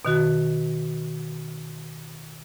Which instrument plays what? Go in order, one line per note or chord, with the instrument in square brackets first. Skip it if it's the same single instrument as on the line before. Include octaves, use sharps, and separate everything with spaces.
[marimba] B2 D#3 F#4